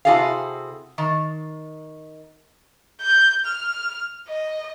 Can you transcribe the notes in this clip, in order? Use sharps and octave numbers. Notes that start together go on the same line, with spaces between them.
C3 E4 F#4 G#4 A4 F5
D#3
G6
F6
D#5